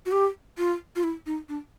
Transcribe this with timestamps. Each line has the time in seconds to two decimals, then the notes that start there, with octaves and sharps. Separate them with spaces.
0.06 F#4
0.12 G4
0.58 F4
0.96 F4
1.03 E4
1.26 D#4
1.49 D4